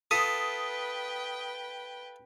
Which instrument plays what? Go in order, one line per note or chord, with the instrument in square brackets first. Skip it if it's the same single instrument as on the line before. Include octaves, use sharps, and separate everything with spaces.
[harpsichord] F4 A4 [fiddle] B4 G5 [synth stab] D#6 [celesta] B6